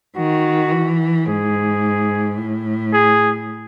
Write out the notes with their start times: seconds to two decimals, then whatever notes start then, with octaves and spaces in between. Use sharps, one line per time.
0.16 D#3 F#4
0.72 E3
1.27 G#2 G#4
2.37 A2
2.93 G#4